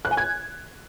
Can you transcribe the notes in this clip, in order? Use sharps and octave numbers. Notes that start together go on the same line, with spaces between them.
F#6
G#5
G#6